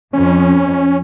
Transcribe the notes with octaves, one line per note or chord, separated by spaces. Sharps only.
F2 C#4